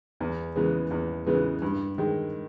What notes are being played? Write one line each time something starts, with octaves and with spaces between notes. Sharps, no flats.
E2
C#3 E3 G#3 B3
E2
C#3 E3 G#3 B3
G2
D#3 G#3